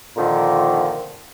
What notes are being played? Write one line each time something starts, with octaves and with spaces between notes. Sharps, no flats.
A#2 D3 D#3 F3